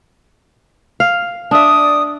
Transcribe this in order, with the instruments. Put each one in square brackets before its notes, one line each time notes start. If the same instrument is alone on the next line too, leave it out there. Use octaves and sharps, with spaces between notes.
[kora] F5
[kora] D4 E5 [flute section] D5 D#6